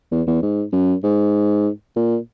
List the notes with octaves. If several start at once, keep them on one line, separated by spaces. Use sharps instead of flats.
E2
E2
G#2
F#2
G#2
A#2